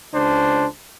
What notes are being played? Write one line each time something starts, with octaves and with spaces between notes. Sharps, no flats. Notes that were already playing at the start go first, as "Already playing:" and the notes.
C#2 D4 C5